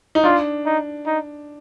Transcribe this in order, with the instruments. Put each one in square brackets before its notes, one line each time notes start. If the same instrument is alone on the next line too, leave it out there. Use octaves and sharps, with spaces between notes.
[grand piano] D#4
[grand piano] D4 [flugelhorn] F4
[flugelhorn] D#4
D#4